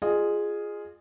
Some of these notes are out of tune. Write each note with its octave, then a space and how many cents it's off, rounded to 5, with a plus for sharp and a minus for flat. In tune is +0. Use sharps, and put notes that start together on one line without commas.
F4 +0 G#4 +0 D#5 -40